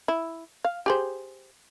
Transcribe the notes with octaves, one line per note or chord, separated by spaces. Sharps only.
E4
F5
G4 G#4 C5